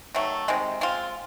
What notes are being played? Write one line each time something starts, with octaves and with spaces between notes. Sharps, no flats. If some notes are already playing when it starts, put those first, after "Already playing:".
D#3 F#3 A3
C3 D#3 G#3
G#3 C4 F4